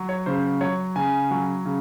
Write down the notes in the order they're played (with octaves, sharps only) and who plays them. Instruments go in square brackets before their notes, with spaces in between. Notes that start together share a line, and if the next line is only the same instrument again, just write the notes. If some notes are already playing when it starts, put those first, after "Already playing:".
Already playing: [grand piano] F#3
C#5
C#3 C5
F#3 C#5
C#3 G#5
F#3
C#3